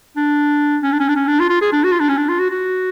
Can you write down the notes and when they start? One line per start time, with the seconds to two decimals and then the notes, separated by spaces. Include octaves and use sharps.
0.16 D4
0.83 C#4
0.92 D4
1.00 C#4
1.08 D4
1.16 C#4
1.27 D4
1.39 F4
1.49 F4
1.61 G#4
1.72 D4
1.84 F#4
1.92 F4
2.00 D4
2.09 C#4
2.17 D4
2.29 F4
2.39 F#4
2.50 F#4